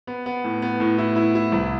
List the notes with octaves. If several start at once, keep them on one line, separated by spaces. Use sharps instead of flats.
B3
B3
A2
B3
A2
E4
E4
E4
C2